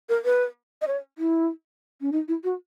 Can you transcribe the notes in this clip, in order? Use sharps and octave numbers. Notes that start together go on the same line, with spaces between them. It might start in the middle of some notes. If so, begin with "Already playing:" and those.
A#4
B4
D#5
C#5
E4
C#4
D#4
E4
F#4